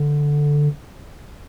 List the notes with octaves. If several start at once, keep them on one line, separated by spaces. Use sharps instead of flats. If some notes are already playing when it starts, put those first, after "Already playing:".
Already playing: D3